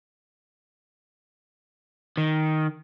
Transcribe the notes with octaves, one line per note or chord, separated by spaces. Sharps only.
D#3